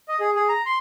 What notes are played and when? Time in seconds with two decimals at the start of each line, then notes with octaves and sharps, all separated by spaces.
0.08 D#5
0.20 G#4
0.35 G#4
0.49 A#5
0.66 C6